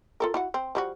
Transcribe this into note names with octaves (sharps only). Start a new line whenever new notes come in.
F4 A4 A#4
E4 F#4 F#5
C4
F3 G3 F#4